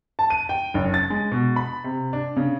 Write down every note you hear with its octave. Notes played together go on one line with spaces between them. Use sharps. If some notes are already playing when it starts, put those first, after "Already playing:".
A5
D#7
G5
F#1
A6
G#3
B2
B5
C3
D4
C#3